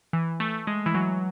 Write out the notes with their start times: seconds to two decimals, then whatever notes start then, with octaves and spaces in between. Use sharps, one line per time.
0.13 E3
0.40 A3
0.67 G#3
0.86 E3
0.94 F#3